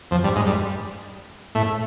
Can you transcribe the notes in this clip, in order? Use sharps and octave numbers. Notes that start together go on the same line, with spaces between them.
F2 F3
G2 G3
G#2 G#3
G2 G3
A2 A3